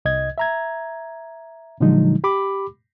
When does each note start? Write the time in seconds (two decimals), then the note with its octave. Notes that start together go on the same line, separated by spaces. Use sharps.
0.05 C2 D#5 G#6
0.38 E5 A#5 G#6
1.80 A#2 D3 F3 F#3 G#3 D#4
2.24 G4 B5 D6